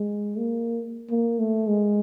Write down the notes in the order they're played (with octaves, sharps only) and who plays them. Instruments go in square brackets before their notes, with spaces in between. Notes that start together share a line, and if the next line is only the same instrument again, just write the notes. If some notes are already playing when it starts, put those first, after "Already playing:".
Already playing: [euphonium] G#3
A#3
A#3
A3
G#3